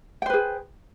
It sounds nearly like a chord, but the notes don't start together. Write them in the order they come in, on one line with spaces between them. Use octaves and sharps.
G5 C5 B4 G#4